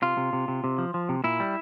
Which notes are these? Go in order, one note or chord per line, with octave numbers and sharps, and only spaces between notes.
C3 F4
C3
C3
C3
C3
F3
F3
C3
A#2 E4
G3